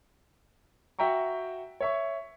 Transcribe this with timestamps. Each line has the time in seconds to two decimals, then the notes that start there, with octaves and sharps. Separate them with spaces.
0.99 F#4 E5 G5 A#5 C#6
1.80 C#5 E5 C#6